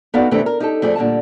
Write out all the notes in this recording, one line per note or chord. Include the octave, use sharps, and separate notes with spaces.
B3 D#4 F#4 A4 D5 F5
C3 E3 A3 C4 D4 G4
A#4
D#4 G4 A4
F2 A3 G#4 D5
A#2 D3 G3 A5